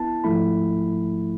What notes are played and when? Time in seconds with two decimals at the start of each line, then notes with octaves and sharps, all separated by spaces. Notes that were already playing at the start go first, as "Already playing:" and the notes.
Already playing: B3 E4 A5
0.24 G#2 F3 A3 E4 B5